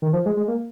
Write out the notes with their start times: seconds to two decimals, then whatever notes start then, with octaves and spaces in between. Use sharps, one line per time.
0.02 D#3
0.13 F3
0.26 G#3
0.37 G#3
0.48 A#3